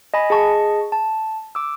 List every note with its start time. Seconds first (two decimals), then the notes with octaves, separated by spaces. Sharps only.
0.14 D#5 G#5 B5
0.30 G#4 D#5 A5 C#6
0.92 A5
1.55 D6 E6